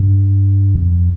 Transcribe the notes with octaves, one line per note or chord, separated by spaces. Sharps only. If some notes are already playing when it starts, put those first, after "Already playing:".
Already playing: G2
F2